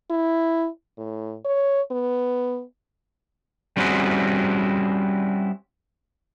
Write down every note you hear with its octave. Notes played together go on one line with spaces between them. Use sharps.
E4
A2
C#5
B3
G3 C4 C#4 E4 F#4 G#4